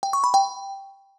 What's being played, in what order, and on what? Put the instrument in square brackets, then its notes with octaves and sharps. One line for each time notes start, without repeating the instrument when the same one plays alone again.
[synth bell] G5
C#6
B5
G5